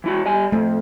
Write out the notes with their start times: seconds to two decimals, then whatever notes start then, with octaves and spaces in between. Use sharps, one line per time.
0.04 E3 E4 F#4
0.26 G3 G#5
0.52 F2 A3